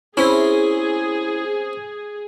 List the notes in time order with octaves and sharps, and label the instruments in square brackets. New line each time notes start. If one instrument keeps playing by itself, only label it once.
[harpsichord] C4 C#4 [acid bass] E4 [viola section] G#4